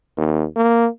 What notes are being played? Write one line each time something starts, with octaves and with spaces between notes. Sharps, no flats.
D#2
A#3